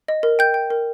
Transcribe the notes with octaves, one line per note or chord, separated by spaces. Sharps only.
D#5
A#4
G5 G6
G5
A#4